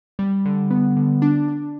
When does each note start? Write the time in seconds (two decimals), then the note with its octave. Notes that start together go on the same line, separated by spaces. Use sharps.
0.19 G3
0.45 D3
0.71 B3
0.96 D3
1.22 D4
1.48 D4